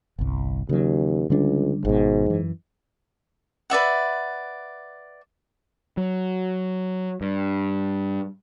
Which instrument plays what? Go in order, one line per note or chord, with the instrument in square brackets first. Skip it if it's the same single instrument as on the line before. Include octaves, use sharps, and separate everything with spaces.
[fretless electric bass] G1 C2
[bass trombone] D#2 [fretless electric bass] C#3 F#3
[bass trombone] C#2 [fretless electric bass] D3 G3 D4
[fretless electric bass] G#1 B2 [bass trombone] G#2
[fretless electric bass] F#2 E3
[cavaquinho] B4 D5 E5 F#5
[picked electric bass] F#3
G2